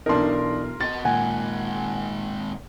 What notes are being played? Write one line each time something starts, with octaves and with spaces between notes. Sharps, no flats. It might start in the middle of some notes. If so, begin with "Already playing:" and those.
B1 E3 D4 D#4 A4 A#4 C6
F#4 D#5 A6
A#2 D#3 G#3 F#5 G#5